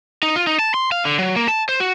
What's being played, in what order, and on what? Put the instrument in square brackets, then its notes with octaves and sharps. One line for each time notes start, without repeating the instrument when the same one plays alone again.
[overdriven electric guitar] D#4
F4
D#4
A5
C6
F5
D3
F#3
A#3
A5
C5
F#4